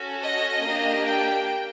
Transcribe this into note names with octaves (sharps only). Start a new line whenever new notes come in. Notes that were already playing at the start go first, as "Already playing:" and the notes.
Already playing: C#4 F#4 A4
D#5
A#3 D4 G4
G5